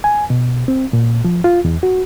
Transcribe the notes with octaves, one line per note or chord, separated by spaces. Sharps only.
G#5
B2
C4
A#2
F3
F4
E2
F#4